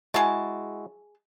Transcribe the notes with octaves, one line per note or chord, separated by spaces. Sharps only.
G#3 E4 F#4 G#4 A5